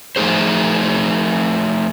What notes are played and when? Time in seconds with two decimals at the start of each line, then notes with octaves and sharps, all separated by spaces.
0.16 F3 A3 D#4 G#4 C5